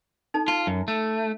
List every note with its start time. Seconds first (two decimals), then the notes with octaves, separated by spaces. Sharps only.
0.34 D#4 A4 A5
0.48 F4 A5
0.67 F#2
0.88 A3